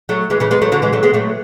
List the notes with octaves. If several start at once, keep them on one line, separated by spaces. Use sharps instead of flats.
F#3 A3
E3 G#3
C#3 E3
G#3 B3
F#3 A3
D3 F#3
E3 G#3
F#3 A3
G#3 B3
F#3 A3